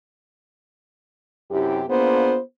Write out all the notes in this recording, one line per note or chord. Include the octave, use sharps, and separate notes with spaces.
F#2 C3 E4 G4
A#3 B3 D4 F4 G#4 C5